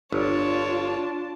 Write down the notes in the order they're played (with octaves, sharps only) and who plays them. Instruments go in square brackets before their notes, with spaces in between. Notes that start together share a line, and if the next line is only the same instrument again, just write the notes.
[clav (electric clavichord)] G1 [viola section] D4 F4 A5 [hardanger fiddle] C#5